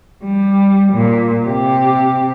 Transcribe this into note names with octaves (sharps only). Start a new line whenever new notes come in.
G3
A#2
C3 G4